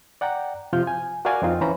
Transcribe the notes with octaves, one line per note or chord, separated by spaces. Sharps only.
D5 F#5 G5 A#5
C3 F3 F4 F6 G6
G#5
F#4 A#4 D5 F5 G#5
F2 C4 D#4 F4
E3 C#4 C5 A#5 B5